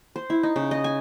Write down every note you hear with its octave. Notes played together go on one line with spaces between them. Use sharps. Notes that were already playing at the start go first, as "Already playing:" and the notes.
C5
E4
D#4
C#3
D#5
G#5